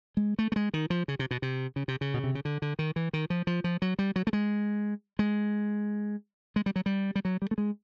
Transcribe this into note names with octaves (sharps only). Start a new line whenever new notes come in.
G#3
A3
A3
G#3
D#3
F3
C#3
C3
B2
C3
C#3
C3
C#3
B2
C3
C#3
D3
D3
D#3
E3
D#3
F3
F3
F3
F#3
G3
F#3
A3
G#3
G#3
G#3
G3
F#3
G3
G3
F#3
G3
A3
G#3